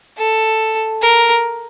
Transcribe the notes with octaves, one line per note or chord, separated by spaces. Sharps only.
A4
A#4